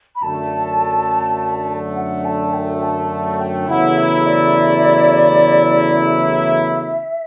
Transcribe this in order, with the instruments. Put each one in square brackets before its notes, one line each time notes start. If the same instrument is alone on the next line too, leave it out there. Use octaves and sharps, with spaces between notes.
[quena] B5
[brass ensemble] F#2 D3 A3 [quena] A5
[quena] F#5
A5
G5
A5
A5
G5
[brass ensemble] E2 C#3 F#3 A3 E4 [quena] F#5
[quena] E5
D5
E5